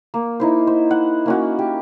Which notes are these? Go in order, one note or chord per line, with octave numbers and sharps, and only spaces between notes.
A#3
D#4 E4 C5
C5
F#5
A#3 C#4 F#4
G4